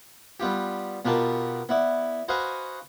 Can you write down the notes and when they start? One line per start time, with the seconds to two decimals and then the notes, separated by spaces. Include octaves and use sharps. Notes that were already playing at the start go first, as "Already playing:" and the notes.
0.40 G3 B3 F4 G4
1.05 B2 B3 F4 G4 A#4 A5
1.69 B3 E4 D5
2.28 F#4 B4 C5 D#5 F5 G#5